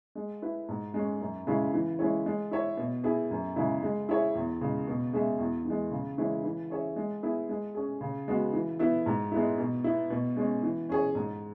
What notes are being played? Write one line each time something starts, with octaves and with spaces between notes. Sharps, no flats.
G#3
E4 B4
G#2
G#3 C#4
F#2
C#3 G#3 C#4 E4
E3
G#3 C#4 E4 C#5
G#3
E4 C#5 E5
B2
B3 E4 G#4
F#2
C#3 G#3 C#4 E4
G#3
E4 G#4 C#5 E5
E2
C#3 G#3
B2
G#3 C#4 G#4 E5
E2
E3 G#3
C#3
E3 G#3 E4 C#5
E3
C#4 G#4 C#5 E5
G#3
B3 E4 G#4
G#3
C#4 G#4
C#3
G#3 B3 F#4
E3
B3 E4 B4
G#2
G#3 B3 E4
B2
B3 E4
B2
G#3 C#4
E3
C#4 G#4 C#5
G#2